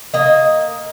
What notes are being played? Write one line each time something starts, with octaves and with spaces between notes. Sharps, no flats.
A#3 D#5